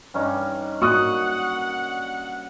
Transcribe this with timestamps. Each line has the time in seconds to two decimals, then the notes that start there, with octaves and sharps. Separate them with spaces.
0.14 G2 C#4 D#4
0.82 A#3 F#4 F#5 C#6 D#6 F#6